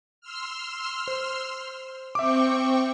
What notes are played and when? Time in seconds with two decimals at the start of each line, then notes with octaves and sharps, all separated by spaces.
0.21 C6 E6 F6
1.08 C5
2.15 C4 E5 G5 C#6 D6